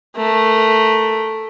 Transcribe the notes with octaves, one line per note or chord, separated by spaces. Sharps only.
A3 A#4